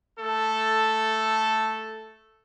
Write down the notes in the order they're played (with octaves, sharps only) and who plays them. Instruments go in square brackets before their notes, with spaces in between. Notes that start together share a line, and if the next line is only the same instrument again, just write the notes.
[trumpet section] A3 A4